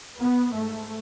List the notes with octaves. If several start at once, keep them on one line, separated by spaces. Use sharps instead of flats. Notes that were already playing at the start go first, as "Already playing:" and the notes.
B3
G#2 A3